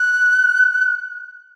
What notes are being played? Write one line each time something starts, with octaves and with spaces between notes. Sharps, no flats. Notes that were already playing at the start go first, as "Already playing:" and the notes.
Already playing: F#6